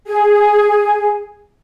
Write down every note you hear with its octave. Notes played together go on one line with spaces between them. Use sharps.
G#4 G#5